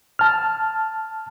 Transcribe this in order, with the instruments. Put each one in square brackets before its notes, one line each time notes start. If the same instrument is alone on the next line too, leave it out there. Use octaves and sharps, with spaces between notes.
[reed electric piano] A5 F6